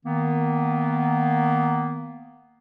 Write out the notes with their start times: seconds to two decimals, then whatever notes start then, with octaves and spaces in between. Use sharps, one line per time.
0.06 D#3 A#3 B3